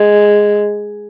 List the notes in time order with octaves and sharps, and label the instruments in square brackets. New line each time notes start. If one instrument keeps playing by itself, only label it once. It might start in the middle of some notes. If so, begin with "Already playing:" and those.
Already playing: [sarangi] G#3